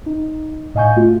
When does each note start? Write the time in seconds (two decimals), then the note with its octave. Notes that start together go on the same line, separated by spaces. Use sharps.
0.06 D#4
0.75 A2 D#5 F5 G#5 C#6 G6
0.96 A3 F4 F#4